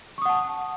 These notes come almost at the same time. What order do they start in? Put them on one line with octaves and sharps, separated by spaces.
C#6 D#6 F#5 A5